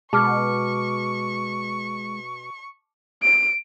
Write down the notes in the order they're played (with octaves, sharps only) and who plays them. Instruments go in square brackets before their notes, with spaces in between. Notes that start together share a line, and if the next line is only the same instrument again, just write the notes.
[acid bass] B2 [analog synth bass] G#3 [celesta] A5 D6 F6 [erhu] C#6
[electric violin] D7